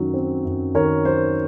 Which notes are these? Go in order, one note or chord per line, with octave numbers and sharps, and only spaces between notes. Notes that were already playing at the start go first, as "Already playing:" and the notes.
Already playing: F#2 D#3 F#3
C4
F#2
D#3 A#4 C#5
F#3 C5